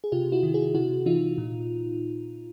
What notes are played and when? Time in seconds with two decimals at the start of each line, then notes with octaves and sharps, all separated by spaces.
0.04 G#4
0.12 C3 F4 G4
0.32 E4 F#4
0.43 D#3
0.54 F#4 G#4
0.74 C3 E4 F#4
1.06 E3 D#4 F4
1.38 A#2